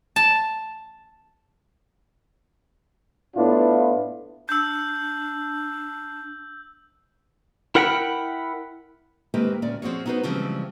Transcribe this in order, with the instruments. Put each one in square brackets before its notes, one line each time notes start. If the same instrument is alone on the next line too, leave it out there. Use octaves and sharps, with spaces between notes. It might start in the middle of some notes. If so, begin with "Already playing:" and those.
[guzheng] A5
[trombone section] A2 B3 D4 E4 F4
[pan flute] D4 [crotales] E6 G6
[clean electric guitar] E4 A#4 F#5 G5 A#5 B5
[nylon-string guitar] D#3 G#3 A#3 C4 G4 B4
D2 A#2 C#4 D5
F3 C4 F#4 G#4 C#5
B3 D#4 F#4 G#4 B4 C5
C#3 E3 F3 G3 G#3 C4